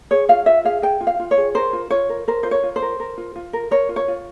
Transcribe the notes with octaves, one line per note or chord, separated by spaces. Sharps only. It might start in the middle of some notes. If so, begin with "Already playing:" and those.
G#4 C#5
F4 F5
F4 E5
G#4 F5
G#4 G5
F4
F5
F4
C#5
G#4
A#4 C5
F4
F4 C#5
A#4
A#4 C5
F4 C5
C#5
F4
C5
A#4
A#4
F4
F4
A#4
A#4 C#5
F4
C#5
F4